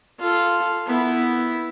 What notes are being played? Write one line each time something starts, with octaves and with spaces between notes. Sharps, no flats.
F4 A4
B3 E4